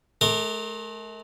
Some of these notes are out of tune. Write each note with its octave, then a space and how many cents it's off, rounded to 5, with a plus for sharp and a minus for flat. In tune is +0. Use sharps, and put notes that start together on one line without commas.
A3 -45 A#4 -20 D6 +15